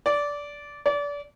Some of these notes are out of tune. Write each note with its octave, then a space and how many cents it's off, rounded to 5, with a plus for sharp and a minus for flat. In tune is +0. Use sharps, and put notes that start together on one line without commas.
D5 -15
D5 -30